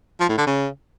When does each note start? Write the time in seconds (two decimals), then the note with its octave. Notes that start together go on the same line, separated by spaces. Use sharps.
0.20 F3
0.29 A2
0.38 D3
0.47 C#3